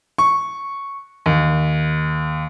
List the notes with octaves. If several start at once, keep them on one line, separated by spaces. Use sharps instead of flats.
C#6
D#2